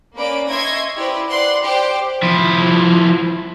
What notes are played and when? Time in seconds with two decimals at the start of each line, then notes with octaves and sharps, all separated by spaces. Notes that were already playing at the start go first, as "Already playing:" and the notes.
0.15 A#3 C#4 B4 D5 B5 D7
0.48 D#5 E5 C6 C#6 G#6 A#6
0.97 E4 G4 B4 C5 D5
1.29 D5 F#5 C6 F#6
1.62 G4 C5 D5 G5
2.22 F3 E4